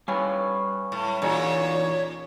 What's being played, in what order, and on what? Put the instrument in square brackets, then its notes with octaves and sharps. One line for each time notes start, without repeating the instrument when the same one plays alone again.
[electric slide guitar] G3 F5 G#5 [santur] C#4 B4 C#5
[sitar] A2
[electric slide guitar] E2 D#4 F#4 [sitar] A#2 [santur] G#4 A#4 G#5 [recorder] C#5